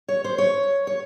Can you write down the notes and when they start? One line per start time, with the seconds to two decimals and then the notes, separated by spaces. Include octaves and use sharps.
0.08 C#5
0.24 C5
0.38 C#5
0.87 C#5